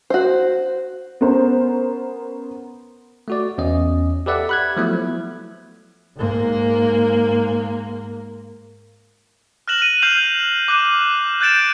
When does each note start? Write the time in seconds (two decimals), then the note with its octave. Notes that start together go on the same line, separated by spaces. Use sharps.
0.10 F#4 C5
1.21 B3 C#4 A#4 C5
3.28 A3 F#4 D5
3.58 E2 C#4 D#5
4.26 G4 A4 B4 D5 E5 F#5
4.49 B5 F#6 G#6
4.77 F3 F#3 A3 B3 E4
6.16 G#2 A#3
9.68 F6 F#6 A#6 E7 F#7
9.82 D#7
10.02 F6 G6 C7 F7 F#7
10.68 D6 F#6 D#7
11.41 F#6 G6 A6 D7 E7